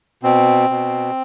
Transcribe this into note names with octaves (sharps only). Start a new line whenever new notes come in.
B2 C4
B2